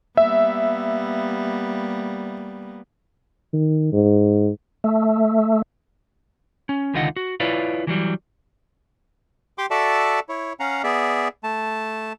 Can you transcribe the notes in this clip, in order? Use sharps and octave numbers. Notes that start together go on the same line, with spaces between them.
G3 A#3 B3 E5
D#3
G#2
A3
C#4
C#2 D3 D#3 F4 D#5 F#5
F#4
E4 F4 B4 C#5 D5 F5
E3 F#3 G3
G4 G5 C6 D6
F#4 A4 D5 E5 A5
E4 C#5
C#4 F5 F#5 A#5
B3 G#4 D5 E5
A3 A5